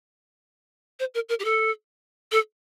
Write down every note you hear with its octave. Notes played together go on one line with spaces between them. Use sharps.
C5
A#4
A#4
G4
A4
A4